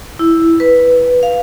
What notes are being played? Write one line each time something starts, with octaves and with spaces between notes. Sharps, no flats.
E4
B4
F5